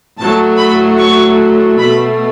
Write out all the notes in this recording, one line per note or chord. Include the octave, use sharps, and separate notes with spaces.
A2 F#3 A3 A5
B5
C#6
B2 A3 B5